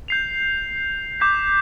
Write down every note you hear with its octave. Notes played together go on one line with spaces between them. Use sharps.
G6 C7 F7
D6 G6 B6